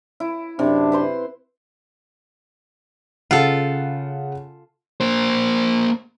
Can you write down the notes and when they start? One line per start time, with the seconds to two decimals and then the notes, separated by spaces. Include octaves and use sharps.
0.20 E4
0.59 F#2 C3 D4
0.92 B4 C5 C6
3.31 C#3 F4 A4 F#5
5.01 A#3 C5